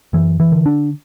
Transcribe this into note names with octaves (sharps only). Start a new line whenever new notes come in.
F#2 E3
E3
D3
D4